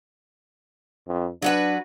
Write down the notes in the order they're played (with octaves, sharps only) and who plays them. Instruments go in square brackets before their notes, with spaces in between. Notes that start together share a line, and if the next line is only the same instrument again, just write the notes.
[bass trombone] F2
[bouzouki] F#3 F#4 B4 [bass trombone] D4